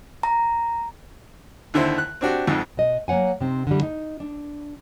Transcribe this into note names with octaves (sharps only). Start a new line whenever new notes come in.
A#5
D#2 D3 E4 C5
F#6
C4 D4 F#4 G4
B1 F2 G#2
B2 D#5
F#3 A#3 C#5 F#5 G#5
C3 C4 D#4
D3 E3 G3
D#4
D4